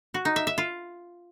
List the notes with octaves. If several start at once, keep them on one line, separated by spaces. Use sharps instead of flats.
F#4
D#4
E5
E5
F4